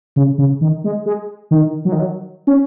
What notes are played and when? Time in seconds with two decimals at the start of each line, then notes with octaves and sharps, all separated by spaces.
0.16 C#3
0.38 C#3
0.61 D#3
0.84 G#3
1.06 G#3
1.51 D#3
1.85 F#3
1.92 D#3
1.99 F#3
2.47 C#4